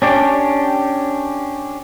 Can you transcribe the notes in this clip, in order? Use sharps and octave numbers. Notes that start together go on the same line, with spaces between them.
C#4 D4 G4